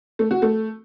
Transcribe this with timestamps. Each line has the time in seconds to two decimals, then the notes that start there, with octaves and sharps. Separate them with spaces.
0.19 A3
0.31 F#4
0.42 A3